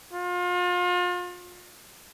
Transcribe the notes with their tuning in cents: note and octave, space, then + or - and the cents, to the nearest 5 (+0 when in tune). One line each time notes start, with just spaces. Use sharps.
F4 +35